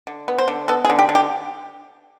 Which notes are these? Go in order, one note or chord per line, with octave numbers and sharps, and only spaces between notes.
D3
B3
C5
D3
B3 A4
G#4
D3
G4
D3
G4